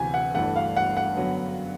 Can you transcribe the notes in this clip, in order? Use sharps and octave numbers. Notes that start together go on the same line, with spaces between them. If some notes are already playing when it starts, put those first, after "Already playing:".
Already playing: D2 C3 E3 G#5
F#5
G1 G2 E3 A3 F#5
F5
F#5
F#5
F#2 D3 F#3 B3